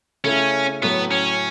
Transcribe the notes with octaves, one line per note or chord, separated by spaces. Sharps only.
C#3 A3 C#4 E4
A2 F#3 A3 B3
C#4